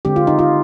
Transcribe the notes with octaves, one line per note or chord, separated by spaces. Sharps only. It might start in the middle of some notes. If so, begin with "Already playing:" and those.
D3 G#3 C4 G4
F4
D#4
F4